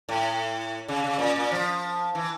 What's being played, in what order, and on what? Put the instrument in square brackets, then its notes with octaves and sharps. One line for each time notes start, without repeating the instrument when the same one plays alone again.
[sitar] A2
C#3
C#3
A#2
A#2
F3
E3